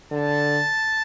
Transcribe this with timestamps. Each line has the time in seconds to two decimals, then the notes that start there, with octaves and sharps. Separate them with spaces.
0.11 D3 A5